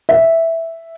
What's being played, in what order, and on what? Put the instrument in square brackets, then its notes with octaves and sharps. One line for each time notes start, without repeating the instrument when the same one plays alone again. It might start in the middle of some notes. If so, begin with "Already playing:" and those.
[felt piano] E5